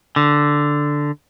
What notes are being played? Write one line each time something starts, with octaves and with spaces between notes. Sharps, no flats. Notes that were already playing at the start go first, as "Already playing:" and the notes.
D3